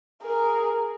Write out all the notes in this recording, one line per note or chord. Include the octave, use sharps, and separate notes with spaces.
G#4 A#4